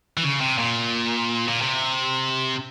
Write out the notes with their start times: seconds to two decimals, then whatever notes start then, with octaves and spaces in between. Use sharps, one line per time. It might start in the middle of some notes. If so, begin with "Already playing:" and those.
0.17 E3
0.24 C#3
0.41 C3
0.58 A#2
1.48 A#2
1.61 C3